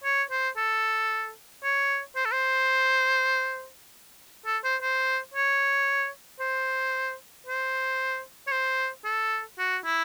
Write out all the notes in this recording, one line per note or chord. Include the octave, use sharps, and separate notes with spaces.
C#5
C5
A4
C#5
C5
A4
C5
A4
C5
C5
C#5
C5
C5
C#5
C5
A4
F#4
E4